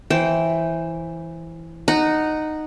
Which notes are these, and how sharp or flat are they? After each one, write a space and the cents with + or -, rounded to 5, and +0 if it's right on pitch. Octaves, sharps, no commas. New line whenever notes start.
E3 +0 C5 +15 G5 -15
D#4 -10 F#5 +0